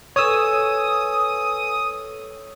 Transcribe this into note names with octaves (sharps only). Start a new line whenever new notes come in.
A4 B4 C#5 G#5 D#6 E6